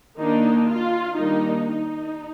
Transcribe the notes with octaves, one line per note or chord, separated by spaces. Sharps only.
D#3 A#3 D4 D#4
F4
D#3 G3 A#3 D4 D#4
D#4